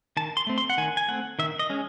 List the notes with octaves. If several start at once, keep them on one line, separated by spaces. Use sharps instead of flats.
D#3 A5
C6
A3 C4
C6
F#5
D#3 G#5
G#5
A3 C4 F#5
D#3 E5
D#5
G#3 C#4